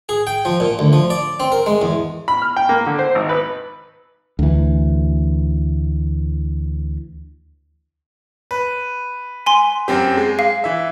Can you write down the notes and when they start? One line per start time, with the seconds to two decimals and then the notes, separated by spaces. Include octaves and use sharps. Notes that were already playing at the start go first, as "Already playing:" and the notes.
0.09 G#4
0.27 G5
0.45 F3
0.60 A#2
0.79 D2
0.93 F3
1.10 D5
1.40 C4
1.52 A#4
1.66 G#3
1.82 E2
2.28 B5
2.42 F6
2.56 G5
2.69 A#3
2.86 D3
2.99 C5
3.15 G#1
3.29 B4
4.39 D2 E3
8.51 B4
9.46 G#5 C6
9.88 F#2 C4 G4
10.17 G#3
10.39 F5
10.64 E3 E5